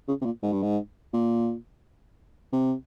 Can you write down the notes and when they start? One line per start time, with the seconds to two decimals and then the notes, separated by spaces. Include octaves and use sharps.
0.08 C#3
0.21 C3
0.25 A#2
0.43 G#2
0.52 G2
0.63 G#2
1.13 A#2
2.52 C3